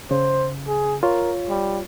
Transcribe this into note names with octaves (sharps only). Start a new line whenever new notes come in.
C#3 C5
G#4
F4 A#4 C#5
G3